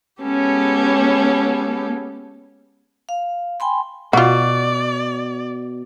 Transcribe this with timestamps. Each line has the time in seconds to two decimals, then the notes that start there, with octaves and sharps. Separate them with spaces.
0.22 G#3 B3 C#4 G4 A4
3.09 F5
3.60 G5 G#5 B5 C6
4.13 B2 F4 F#4 D5